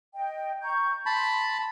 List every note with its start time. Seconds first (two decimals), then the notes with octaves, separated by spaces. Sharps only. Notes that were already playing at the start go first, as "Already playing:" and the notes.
0.15 D#5 G5
0.61 A#5 C#6 G6
1.06 A5 B5 C6